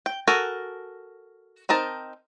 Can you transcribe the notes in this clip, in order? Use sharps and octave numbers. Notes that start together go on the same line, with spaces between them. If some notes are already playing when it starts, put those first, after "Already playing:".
G5
F#4 A4 A#4 G#5
C4 D#4 A#4 A5